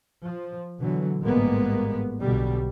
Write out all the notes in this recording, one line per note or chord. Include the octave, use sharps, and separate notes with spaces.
F3
B2 D3 E3 F#3
A1 G#2 G3 G#3 A#3 B3
B1 B2 D3 G3